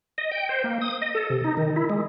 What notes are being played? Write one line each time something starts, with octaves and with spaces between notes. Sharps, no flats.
D#5
G5
C5
A#3
D#6
D#5
A4
C3
D#4
D#3
E4
G#3